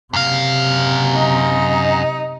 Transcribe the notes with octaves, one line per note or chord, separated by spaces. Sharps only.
F#2 C3 F5
D#4